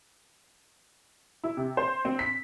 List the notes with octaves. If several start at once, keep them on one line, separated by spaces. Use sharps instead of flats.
E4
C3
C5
C4
B6